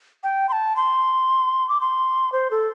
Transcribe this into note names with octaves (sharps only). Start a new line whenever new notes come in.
G5
C6
A5
C6
D6
C6
C5
A4